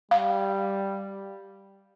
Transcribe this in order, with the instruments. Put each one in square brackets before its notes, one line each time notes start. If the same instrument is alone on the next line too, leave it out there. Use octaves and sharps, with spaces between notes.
[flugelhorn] G3 [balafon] F5